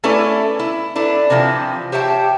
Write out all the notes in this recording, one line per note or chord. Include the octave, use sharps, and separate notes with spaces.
A3 C#4 E4 A4 B4 D5
E4
D4 E4 A4 B4
C3 E3 F3 C4
G4 C5 C#5 E5 G5 A5